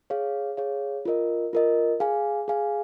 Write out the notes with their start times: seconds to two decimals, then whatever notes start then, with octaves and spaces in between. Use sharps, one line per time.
0.10 G#4 C#5 F5
0.57 G#4 C#5 F5
1.05 F4 A#4 D#5
1.53 F4 A#4 D#5
2.00 G#4 F5 G#5
2.48 G#4 F5 G#5